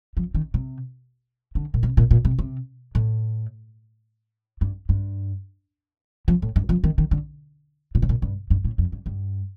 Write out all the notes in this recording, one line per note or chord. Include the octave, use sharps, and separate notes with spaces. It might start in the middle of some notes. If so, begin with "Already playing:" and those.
F3
D#3
C3
D3
A#2
C3
A#2
A#2
C3
C3
A2
G2
G2
F3
A2
G2
F3
D#3
D#3
D3
A#2
C3
A#2
G2
G2
A2
F2
G2
G2